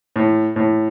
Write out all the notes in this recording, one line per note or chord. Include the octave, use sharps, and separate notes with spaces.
A2
A2